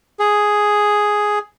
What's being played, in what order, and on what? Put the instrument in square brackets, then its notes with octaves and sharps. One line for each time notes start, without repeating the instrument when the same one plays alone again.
[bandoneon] G#4